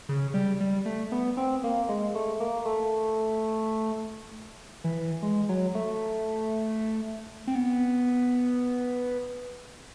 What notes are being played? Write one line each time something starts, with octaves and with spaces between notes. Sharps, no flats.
C#3
G3
G3
A3
B3
C4
A#3
G#3
A3
A#3
A3
E3
G#3
F#3
A3
C4
B3